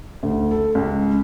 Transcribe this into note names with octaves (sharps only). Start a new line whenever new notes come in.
D2
A4
C#2